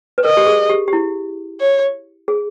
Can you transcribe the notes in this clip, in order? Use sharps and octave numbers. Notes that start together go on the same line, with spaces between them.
B4
A#4 D#5
G4
G#4
G4
G4
E4
C#5
G#4